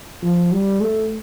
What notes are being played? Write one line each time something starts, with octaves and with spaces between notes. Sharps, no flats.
F3
G3
A3